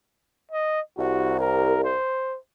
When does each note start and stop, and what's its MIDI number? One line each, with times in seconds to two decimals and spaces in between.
0.51 0.80 75
0.98 1.95 36
0.98 1.36 66
1.39 1.84 70
1.84 2.38 72